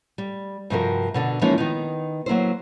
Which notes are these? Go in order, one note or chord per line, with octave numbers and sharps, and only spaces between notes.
G3
G2 C3 F3 F#4 A4 A#4
B2 D3 D4
E3 F3 G#3 A#3 C#4 D#4
D#3 B3 D#4
F#3 A#3 E4 C5